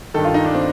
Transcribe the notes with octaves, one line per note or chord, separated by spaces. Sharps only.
G2 D#3 A4
F4
D#4
D4
C4